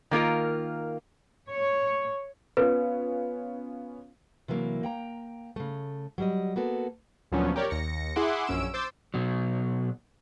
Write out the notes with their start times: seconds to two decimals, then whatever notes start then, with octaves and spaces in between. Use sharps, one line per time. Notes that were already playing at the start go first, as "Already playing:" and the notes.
0.11 D#3 A#3 F4 A#4
1.48 C#5
2.57 B3 C#4 F4 B4
4.48 C3 E3 F#3 A#3
4.83 A#3 G5 A#5
5.56 C#3 A3
6.18 F#3 G3 D#5
6.56 A#3 B3 F#4 A4
7.32 D2 A#2 F3 F#3 B3 C#4
7.56 G4 A#4 C#5 D5
7.70 D#2 A#6 C#7
8.16 E4 G#4 E5 F#5 C6 D6
8.46 A#1 F#2 C#4 E6 D7 E7
8.74 C5 C6 D6 E6 G6 A6
9.14 B2 F#3